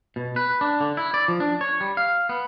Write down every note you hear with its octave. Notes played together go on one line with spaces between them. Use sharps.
B2
B4
D4
D3
E4
D5
F3
D4
C#5
G3
F5
B3